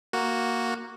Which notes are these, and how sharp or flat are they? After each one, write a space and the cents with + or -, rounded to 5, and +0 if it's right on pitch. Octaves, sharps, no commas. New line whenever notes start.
A#3 +0 F#4 +0